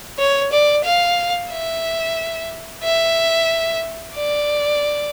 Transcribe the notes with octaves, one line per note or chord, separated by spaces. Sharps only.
C#5
D5
F5
E5
E5
D5